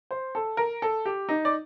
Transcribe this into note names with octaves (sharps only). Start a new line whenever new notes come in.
C5
A4
A#4
A4
G4
D#4
D5